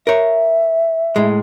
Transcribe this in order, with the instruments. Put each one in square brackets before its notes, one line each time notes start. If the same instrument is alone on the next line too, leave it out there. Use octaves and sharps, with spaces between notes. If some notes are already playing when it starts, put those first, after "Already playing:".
[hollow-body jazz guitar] A#4 C#5 [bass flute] E5
[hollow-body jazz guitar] A2 G#3